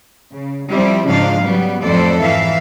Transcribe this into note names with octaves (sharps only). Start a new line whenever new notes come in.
C#3
F3 G3 C4 E4
G#2 C#3 F3 D4 D#4 F5
C#3 F#3 G3 B3
F2 A2 A4 C5 D5
G#2 E3 E5 F5